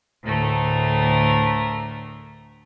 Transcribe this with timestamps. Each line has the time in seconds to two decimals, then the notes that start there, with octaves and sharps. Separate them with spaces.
0.23 D2 A2 A3 A#4